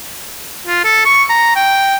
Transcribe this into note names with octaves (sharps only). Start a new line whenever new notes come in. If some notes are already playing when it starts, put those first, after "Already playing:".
F4
A4
C#6
A#5
G5